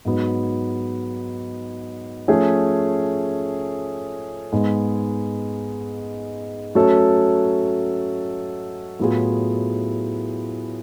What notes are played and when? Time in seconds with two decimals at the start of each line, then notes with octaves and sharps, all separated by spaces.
0.05 G#2 F#3 B3
2.28 F3 A3 C#4 G#4
4.52 G#2 G#3 B3
6.75 F#3 A3 C#4 F#4 A4
8.99 A2 F#3 B3 F4 G#4